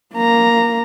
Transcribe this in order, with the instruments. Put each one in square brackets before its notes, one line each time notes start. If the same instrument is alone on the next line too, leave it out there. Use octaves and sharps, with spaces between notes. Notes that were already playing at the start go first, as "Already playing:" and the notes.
[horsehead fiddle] A#3 A#5